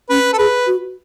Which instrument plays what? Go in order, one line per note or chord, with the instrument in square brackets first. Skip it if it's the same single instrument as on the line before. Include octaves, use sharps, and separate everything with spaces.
[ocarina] C#4 [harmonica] B4
[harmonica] A4
[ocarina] G#4 [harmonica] B4
[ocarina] F#4